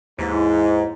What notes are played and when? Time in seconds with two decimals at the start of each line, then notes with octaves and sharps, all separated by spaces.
0.19 D#2 G#2 E3